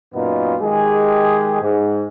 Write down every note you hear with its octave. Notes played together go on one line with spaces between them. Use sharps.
F#2 A#2 B3 D#4 F4
D#3 G#3 G4 G#4
G#2